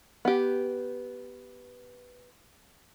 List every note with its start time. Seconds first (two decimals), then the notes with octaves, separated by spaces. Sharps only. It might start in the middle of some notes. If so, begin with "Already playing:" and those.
0.25 B3 G4